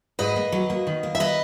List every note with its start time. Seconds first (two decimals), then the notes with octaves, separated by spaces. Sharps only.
0.19 G#2 B4 D#5
0.36 A#3
0.52 F#3
0.70 A#3
0.87 D#3
1.03 A#3
1.15 E5
1.20 A#3 B4 D#5